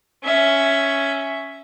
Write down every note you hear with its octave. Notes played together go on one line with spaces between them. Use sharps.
C#4 E5